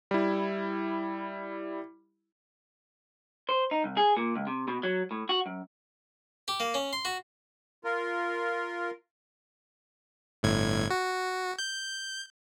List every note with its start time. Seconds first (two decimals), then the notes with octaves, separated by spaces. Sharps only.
0.11 G3 E4
3.49 C5
3.71 D#4
3.84 C2
3.97 G#4
4.17 A#2
4.36 C#2
4.47 C3
4.68 B2
4.83 F#3
5.11 A2
5.29 F#4
5.46 F#2
6.48 G4
6.60 A#3
6.74 C#4
6.93 C6
7.05 F#4
7.84 F4 A#4
10.43 G1 A2 G#6
10.91 F#4
11.59 G6